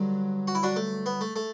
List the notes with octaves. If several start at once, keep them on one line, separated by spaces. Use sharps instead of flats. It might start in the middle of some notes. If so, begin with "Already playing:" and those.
Already playing: G2 D3 F#3
F#4
E4
D4 F#4
A3
B3
A3
A3